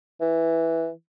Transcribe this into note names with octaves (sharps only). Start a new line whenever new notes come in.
E3